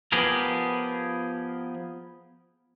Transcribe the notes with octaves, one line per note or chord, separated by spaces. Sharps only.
F3 B3 G4 G#4 A#4